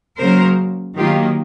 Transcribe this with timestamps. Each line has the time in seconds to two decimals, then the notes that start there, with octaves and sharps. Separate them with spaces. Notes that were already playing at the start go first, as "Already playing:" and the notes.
0.18 C#3 F#3 A#3 A#4 C5
0.97 D#3 F#3 A#3 F4 G4